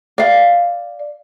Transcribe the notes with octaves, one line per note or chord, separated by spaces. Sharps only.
D5 F5